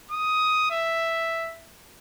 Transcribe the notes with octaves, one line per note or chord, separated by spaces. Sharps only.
D#6
E5